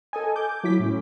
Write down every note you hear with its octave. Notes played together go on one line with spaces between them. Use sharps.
A4 D#5 G#5
D6 G6
F#3 E4 D6 B6
A2 C#4